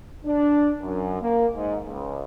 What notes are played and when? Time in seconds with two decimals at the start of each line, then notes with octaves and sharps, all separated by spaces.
0.25 D4
0.81 F#2
1.21 A#3
1.55 G#2
1.86 C#2